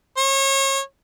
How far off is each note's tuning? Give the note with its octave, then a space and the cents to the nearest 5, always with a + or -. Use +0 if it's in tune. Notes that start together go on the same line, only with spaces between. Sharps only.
C#5 -35